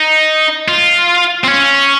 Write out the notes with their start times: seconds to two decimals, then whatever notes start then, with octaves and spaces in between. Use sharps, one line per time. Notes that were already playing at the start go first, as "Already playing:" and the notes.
Already playing: D#4
0.68 F4
1.44 C4
1.48 C#4